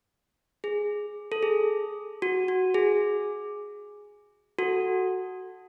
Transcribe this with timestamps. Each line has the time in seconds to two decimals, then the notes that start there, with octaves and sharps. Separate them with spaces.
0.64 G#4
1.32 A4
1.43 G#4
2.22 F#4
2.48 F#4
2.74 G#4
4.59 F#4 A4